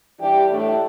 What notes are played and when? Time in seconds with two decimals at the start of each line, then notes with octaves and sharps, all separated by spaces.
0.20 E3 G3 D4 G4
0.50 A2 A3 D4